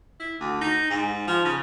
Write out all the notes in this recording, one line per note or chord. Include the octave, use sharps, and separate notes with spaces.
E4
D2
D#4
G#2
F3
C#3